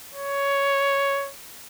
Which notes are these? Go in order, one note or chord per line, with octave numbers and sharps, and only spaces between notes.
C#5